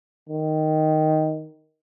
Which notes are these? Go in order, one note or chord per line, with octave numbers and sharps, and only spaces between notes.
D#3